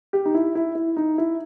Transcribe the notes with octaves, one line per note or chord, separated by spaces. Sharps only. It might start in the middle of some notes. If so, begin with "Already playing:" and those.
G4
D#4
E4
E4
E4
D#4
E4